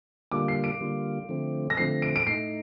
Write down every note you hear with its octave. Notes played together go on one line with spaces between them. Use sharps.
D3 G3 A#3 F4 D6
C7
D7
D3 G3 A#3 F4
D3 F3 A3 C4
A#6
D3 F3 A3 C4 C7
D7
D7
A2 A3 D#4 C7